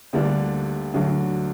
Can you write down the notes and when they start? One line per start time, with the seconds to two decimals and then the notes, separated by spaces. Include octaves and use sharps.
0.13 D2 D3 G3 A#3 D4
0.94 D2 D3 F#3